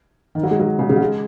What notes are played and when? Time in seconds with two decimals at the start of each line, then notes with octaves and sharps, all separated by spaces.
0.35 D#3
0.43 F#3
0.51 G#3
0.59 F#3
0.79 C#3
0.89 C#3
0.96 F#3
1.01 G#3